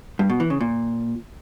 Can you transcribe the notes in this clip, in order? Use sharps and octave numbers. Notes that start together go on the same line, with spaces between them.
G2
B2
E3
C#3
A#2